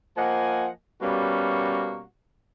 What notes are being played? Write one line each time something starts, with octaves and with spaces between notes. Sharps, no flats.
F3 A#3 D#5 F#5 G#5
B2 G3 A#3 C#4 F#4